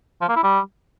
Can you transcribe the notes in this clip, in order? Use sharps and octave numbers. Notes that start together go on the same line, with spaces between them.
F3
A#3
E4
G3